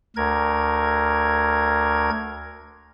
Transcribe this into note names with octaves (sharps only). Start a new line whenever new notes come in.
D2 A#4 G#6